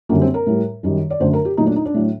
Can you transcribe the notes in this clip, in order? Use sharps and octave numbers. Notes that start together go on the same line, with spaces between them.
F#2 D3 G3 A#3
C4
A#4
A2 G3
F#2 D#3 G3
D5
F#2 D3 F#3 A3 C5
A#4
G4
A#2 F#3 A3 D#4
D4
D#4
D4
A2 F#3 A3